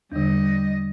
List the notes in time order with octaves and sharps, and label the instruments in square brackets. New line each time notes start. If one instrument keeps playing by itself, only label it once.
[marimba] E2 D3 [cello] G3 D#5